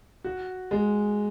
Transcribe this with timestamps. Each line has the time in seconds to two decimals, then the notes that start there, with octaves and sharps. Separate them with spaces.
0.24 F#4
0.71 G#3